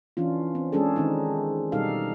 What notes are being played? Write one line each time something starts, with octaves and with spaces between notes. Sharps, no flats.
E3 C#4 D4 F4
C4
G#3 C#4 D4 G#4 A4
D#3 C4 D#4
B2 G3 D#4 G4 A4 F5